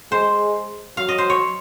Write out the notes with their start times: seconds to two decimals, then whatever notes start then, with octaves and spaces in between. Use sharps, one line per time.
0.12 G#3 C5
0.97 F#3 F5
1.09 D#5
1.18 C5
1.30 C#5